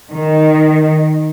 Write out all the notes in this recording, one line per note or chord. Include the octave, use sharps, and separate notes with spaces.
D#3